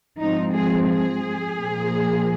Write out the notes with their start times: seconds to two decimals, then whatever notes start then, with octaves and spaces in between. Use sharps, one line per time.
0.20 G#2 F3 G#3 C4 D#4
0.54 G#4
0.88 G#4
1.56 A#2 F3 A#3